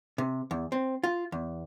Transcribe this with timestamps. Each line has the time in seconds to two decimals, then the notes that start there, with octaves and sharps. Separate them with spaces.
0.18 C3
0.51 E2
0.72 C4
1.04 F4
1.32 E2